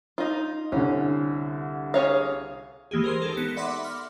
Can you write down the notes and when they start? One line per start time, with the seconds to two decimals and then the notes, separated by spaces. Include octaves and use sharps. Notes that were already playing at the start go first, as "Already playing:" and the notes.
0.18 D#4 F4
0.72 C2 D3 C#4
1.94 G#4 C#5 F5
2.91 E3 G#3 A#3 G4 G#4
3.04 A#4 C5 C6
3.22 D#4 G4 A4
3.37 B3 A#6 C#7
3.56 D5 E5 F#5 B5 C6 D6
3.84 F6